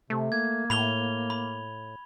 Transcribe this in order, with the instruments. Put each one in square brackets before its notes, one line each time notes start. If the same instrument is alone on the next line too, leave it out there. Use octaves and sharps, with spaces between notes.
[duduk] C3 [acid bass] A3
[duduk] A#3 [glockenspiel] G#6
[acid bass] A2 [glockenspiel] B5 F7 G7
[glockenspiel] B5